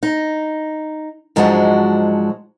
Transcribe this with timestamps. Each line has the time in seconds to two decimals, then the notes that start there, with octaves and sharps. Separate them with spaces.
0.03 D#4
1.36 G#2 F3 F#3 G#3 D4 F#4